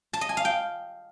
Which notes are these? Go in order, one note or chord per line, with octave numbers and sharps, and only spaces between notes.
A5
D#5
G#5
F5
G5